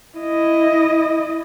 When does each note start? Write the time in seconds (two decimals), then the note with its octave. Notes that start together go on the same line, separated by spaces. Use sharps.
0.18 E4 D#5